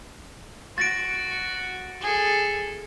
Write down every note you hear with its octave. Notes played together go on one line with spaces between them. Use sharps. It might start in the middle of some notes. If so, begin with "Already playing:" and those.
F#4 A6 A#6 D7
G#4 A4